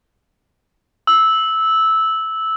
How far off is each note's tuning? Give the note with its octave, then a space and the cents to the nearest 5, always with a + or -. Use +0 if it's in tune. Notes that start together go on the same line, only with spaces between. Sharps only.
E6 -10